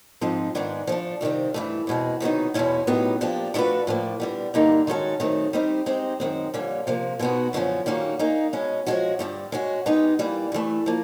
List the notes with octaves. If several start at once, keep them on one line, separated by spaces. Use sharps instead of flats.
G#2 F3 G#3 C4 D#4
G#2 D#3 G#3 B3 D4
F3 A3 D4
F2 C3 D#3 G3 C4
G2 E3 A3
E2 B2 G#3 C4
C3 D#3 F#3 B3 D#4
E2 B2 G#3 C#4 E4
A2 F#3 B3 D#4 G4
F3 A#3 D4 G4
F3 A3 D4 F#4 B4
A2 F3 A#3
D3 G3 B3
G2 D3 G3 A#3 D#4
D#3 G#3 C#4 F#4 A4
F#2 D#3 F#3 A3 C4
G3 C4 D#4 G4 C5
G#3 C4 D#4 G4
F#2 D#3 G#3 C4
F2 D3 G3 A#3 C#4
C3 F3 A#3
B2 G#3 B3 D#4 F#4
F#2 D3 F3 A3 C#4
D#3 G3 A#3 C#4 F#4
A#3 D#4 G#4
B2 G#3 C#4
F3 G#3 C#4 F#4
G2 D3 G3
G#3 C#4 F#4
G#3 B3 D#4 G4
E3 G3 A#3
G2 E3 A3
F3 A#3